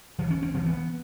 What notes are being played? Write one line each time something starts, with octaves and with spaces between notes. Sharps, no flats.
E3
C#4
C4
E3
B3